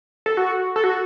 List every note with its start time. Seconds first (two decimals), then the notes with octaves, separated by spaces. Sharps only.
0.26 A4
0.37 F#4
0.76 A4
0.84 F#4